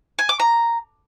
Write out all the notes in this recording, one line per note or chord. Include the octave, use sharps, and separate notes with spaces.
G#5
D6
A#5